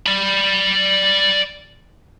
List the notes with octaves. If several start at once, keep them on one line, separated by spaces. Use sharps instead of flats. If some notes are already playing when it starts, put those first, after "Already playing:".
D5 B5